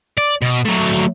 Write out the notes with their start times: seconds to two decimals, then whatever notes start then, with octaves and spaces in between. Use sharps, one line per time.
0.18 D5
0.42 B2
0.65 F#3 A3